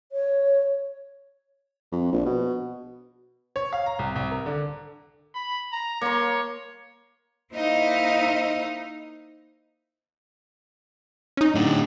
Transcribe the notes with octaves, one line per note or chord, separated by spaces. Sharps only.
C#5
F2
A#1
B2
C#5
F5
A#5
C2
C2
A#4
D3
B5
A#5
A#3 C#5 C6
A#3 D#4 E4 C5 D#5 F5
C#4 D#4
A2 D4